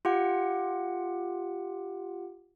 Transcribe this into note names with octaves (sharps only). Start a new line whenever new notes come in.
F4 G4 F#5